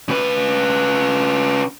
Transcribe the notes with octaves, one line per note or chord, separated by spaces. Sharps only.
C#3 B4